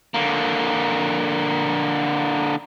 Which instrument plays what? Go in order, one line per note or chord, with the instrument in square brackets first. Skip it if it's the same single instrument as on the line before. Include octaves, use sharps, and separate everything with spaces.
[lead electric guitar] D3 A#3